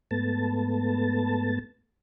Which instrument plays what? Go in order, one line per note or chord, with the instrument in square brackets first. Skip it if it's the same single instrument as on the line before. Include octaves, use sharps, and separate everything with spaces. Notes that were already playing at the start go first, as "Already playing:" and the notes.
[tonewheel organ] G#2 A3 B3 A5